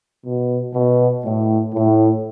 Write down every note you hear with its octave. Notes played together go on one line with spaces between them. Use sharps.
B2
B2
A2
A2